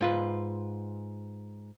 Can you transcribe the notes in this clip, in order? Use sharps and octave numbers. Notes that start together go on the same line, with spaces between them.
G#2 F4 B4